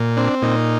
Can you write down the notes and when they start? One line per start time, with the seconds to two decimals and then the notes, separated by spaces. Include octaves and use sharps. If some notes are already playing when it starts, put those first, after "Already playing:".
Already playing: A#2
0.17 C4 D4
0.42 A#2 D#4